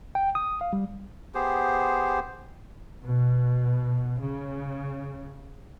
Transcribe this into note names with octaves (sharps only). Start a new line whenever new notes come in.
G5
D#6
F5
G3
B3 G4 G#4 C5
B2
C#3